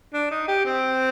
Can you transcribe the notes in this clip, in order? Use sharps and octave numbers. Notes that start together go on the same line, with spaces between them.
D4
D#4
G4
C4